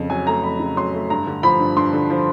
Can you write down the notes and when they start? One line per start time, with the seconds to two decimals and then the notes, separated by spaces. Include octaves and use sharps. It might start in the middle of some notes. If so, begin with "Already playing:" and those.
Already playing: F2 C#3
0.10 F#3 G#5
0.27 A3 A#5
0.43 F2 B5
0.60 C#3
0.76 F#3 C6
0.94 A3
1.10 G2 A#5
1.27 D3
1.43 F3 B5
1.60 G2
1.76 G2 C6
1.93 D3
2.10 F3